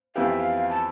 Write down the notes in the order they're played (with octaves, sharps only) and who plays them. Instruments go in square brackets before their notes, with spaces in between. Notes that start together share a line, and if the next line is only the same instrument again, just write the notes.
[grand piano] F2 E3 B3 E4 G4 [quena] F5
[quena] E5
F5
A5